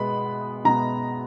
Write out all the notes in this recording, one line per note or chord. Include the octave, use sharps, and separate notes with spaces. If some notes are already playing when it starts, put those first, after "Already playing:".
Already playing: B2 G#3 B3 B5
B2 G#3 B3 A#5